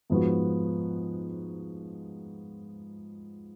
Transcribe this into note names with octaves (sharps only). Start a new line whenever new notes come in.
G#2 F3 B3 F#4